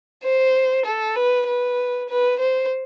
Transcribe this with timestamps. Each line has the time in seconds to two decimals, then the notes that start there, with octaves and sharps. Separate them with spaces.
0.24 C5
0.86 A4
1.16 B4
1.47 B4
2.09 B4
2.39 C5